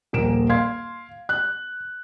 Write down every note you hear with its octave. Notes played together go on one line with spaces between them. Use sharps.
D#1 A#1 A#4 D7 E7
F5 C6 G#6
F#6